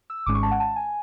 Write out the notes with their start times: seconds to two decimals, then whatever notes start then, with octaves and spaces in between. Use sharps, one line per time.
0.10 E6
0.26 G#1 G#2 G#3 C#4 D6
0.35 C#6
0.43 A5
0.51 F#5
0.60 A5
0.76 G#5